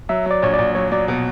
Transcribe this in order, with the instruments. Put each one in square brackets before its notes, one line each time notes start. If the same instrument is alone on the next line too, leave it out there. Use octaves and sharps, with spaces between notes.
[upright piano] F#3 [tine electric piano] E5
[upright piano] F#3 [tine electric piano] D5
[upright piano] A#1 [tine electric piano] C#5
[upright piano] A#1 [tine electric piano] D5
[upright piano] F#3 [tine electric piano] C#5
[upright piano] F#3 [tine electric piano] D5
[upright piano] B2